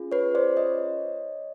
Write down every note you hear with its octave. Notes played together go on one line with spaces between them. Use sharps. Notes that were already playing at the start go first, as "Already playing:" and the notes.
Already playing: C#4 F4 G#4
B4 C#5
C5 D5
C#5 D#5